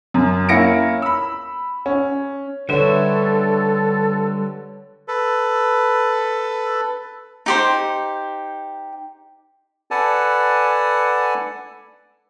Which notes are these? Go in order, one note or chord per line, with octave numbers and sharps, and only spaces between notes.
F#2
A#3 C#4 E4 A#6 C#7 D7
B5 E6
C#4
D3 G3 A4 B4 C#5 E5
A4 B4
D#4 G4 C5
A4 B4 D5 F#5 G#5 A5